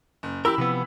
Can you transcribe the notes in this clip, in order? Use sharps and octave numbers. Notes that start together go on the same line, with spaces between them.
F#1
E3 G4 A#4 B5 E6
C3 F3 B3